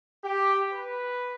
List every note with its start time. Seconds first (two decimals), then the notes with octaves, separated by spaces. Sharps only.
0.24 G4
0.72 B4